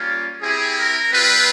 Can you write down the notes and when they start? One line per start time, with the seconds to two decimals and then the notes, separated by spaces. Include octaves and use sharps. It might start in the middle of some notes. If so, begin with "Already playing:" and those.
Already playing: G3 A#3 C#4 F4
0.42 C4 E4 G4 G#4
0.77 A#4
1.12 G3 C4 F4 B4